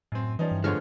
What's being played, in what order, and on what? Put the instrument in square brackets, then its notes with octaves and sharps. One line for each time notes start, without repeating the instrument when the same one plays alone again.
[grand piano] F#2 C4 [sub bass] A2
[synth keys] E3 G3 [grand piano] F3 C#4 D#4
[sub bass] G2
[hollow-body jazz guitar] D3 F3 G#3 [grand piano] A3 B3 C#5 [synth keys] F6